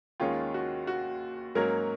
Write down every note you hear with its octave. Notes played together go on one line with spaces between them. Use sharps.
D#2 D#3 G#3 C#4 F4
F#4
F#4
G#2 F#3 A#3 C#4 A#4